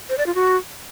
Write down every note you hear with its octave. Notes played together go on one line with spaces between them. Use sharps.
C5
D5
F4
F#4